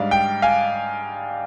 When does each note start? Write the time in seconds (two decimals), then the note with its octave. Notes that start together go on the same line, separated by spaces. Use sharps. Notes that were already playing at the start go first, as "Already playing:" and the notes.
Already playing: G#2 G3 D4 F5
0.11 G5
0.42 F5 G#5